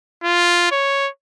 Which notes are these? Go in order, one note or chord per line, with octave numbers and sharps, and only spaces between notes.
F4
C#5